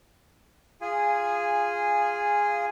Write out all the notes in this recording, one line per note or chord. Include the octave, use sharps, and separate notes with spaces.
F4 G#4 G#5